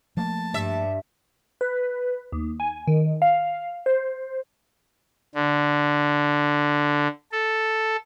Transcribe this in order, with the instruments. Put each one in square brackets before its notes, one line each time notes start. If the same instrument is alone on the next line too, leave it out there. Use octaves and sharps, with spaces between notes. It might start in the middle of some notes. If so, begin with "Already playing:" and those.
[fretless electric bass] F3 A3 A#3 [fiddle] A5
[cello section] G2 [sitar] E5
[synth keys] B4
D#2
G#5
D#3
F5
C5
[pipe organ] D3
A4